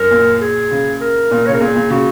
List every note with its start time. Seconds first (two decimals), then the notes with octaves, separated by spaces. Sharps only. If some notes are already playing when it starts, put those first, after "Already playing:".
Already playing: F#2 A#4
0.11 A#2
0.41 G#4
0.71 C#3
1.01 A#4
1.31 A#2
1.46 C#5
1.49 C#3 A#4
1.61 A#2 G#4
1.76 A#2
1.90 C#3 F#4